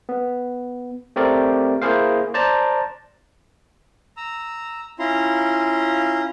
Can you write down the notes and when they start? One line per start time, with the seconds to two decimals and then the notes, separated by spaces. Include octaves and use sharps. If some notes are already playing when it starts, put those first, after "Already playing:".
0.09 B3
1.16 A3 C4 G4 A#4 D5
1.82 A#3 E4 G#4 C5 F5
2.34 C5 D5 A5 A#5
4.17 A#5 E6
4.99 C#4 E4 F4 A#5 C6